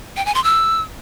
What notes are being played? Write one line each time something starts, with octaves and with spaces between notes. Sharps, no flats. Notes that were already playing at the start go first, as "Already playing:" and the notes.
G5
G#5
C6
E6